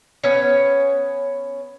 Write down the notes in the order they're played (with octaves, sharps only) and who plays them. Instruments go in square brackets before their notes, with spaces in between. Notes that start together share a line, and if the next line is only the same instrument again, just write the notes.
[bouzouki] B3 C#4 C#5